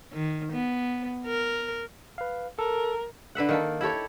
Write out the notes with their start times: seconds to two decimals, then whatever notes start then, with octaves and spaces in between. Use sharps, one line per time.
0.13 D#3
0.53 B3
1.26 A#4
2.18 B4 F5
2.59 A4 A#4
3.35 D3 B4 E5 F#5
3.49 D#3 A#3 A4
3.81 E4 G4 A4 C#5